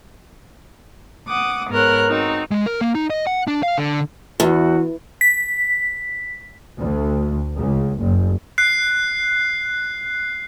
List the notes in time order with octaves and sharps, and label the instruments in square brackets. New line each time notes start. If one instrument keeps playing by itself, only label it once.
[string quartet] F#5 D6 D#6
G#2 B3 A#4 C#5 F#6
C4 D#4 F#4
[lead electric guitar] G#3
A#4
A#3
D#4
D#5
F#5
D4
F5
D3
[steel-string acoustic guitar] E2 [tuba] E3 [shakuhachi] F#4
[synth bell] B6
[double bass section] D2
C#2
F#1
[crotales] F#6 C7